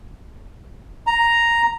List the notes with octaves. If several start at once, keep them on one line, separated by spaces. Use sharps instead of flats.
A#5